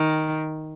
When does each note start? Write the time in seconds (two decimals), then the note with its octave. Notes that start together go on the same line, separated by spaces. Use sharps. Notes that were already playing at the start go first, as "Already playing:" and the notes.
Already playing: D#3